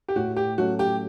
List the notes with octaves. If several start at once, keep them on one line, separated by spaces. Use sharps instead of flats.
G4
A2 F#4
G4
F#3 A3 C#4 F#4
G4